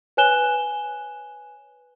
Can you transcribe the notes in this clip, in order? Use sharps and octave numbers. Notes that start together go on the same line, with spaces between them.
B4 C#5 G#5 F#6 E7 G7